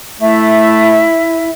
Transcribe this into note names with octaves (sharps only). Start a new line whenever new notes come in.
A3 E4 E5